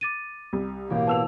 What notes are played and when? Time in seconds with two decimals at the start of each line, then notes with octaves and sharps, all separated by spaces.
0.01 D6 A6 D#7
0.53 C2
0.90 A1 B2 A#3 G4
1.07 B3 A5 E6 F7